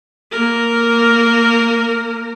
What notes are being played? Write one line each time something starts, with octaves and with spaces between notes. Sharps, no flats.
A#3 A#4